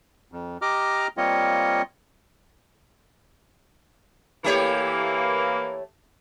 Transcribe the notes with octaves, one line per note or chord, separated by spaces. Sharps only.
F2
G4 D#5 A#5 D6 F6
G3 A#3 C4 F4 C#5 D#5
E3 A3 A#3 G4 C#5